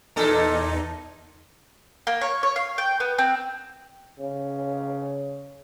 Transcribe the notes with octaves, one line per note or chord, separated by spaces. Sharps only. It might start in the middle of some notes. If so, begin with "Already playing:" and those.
E2 A#2 D#4 A4
A#3
C#5
C#5
F5
G5
B3
C4
C#3